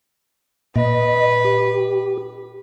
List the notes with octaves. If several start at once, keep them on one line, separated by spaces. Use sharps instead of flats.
A#2 B4 D#5
G4